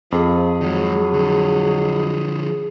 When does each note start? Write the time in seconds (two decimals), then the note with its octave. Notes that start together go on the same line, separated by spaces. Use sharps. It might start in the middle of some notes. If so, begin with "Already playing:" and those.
0.12 F2 F3 G#4
0.61 D#3 F#3 G#3
1.13 D3 F3